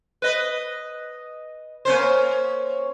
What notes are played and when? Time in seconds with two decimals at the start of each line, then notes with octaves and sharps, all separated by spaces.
0.22 B4 D#5
1.85 A#3 C#4 C5